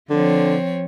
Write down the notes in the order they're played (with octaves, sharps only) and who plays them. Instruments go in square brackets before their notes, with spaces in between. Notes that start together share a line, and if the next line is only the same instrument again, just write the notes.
[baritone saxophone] D3 [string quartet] F3 C4 C#5